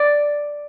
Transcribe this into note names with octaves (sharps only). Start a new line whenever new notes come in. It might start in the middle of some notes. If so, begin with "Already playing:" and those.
Already playing: D5